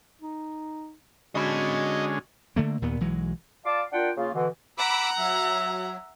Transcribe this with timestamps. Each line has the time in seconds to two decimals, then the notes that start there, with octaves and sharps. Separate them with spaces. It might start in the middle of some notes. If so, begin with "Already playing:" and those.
0.22 D#4
1.35 D3 G#3 C#4 F#4 D#5 B5
2.56 D3 A3 A#3
2.82 D#2 A#2 B3
3.00 B1 E3 F#3 G#3
3.65 F4 D5 F5 A5 D6
3.93 D4 F4 A#4 F#5 G5
4.17 C#3 A#3 F4
4.34 B2 D3 E3
4.78 F#5 A#5 B5 D6 E6
5.18 F#3 E5